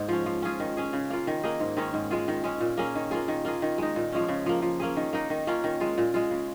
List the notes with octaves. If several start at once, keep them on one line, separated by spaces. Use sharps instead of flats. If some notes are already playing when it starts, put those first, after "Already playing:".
Already playing: G#2 G#3 A#3
F3 C#4
F3
C#4 F4 G#4
D#3
C#4 G#4
C#3
A#3 F4
D#3
A#3 D#4 G#4
G#2
D#3 G#3 C#4
G#2
G#3 F4 G#4
D#3
G#3 C#4
A#2
A#3 C#4 G#4
D#3
A#3 F4 G#4
D#3
A#3 F4 G#4
D#3
G#3 D#4
A#2
F3 G#3 C#4
C#3
F3 A#3
F3
A#3 C#4 G#4
D#3
A#3 D#4
D#3
A#3 C#4 F4
D#3
G#3 F4
A#2
G#3 F4
C#3